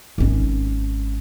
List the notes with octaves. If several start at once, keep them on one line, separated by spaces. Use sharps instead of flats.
G#1 C#4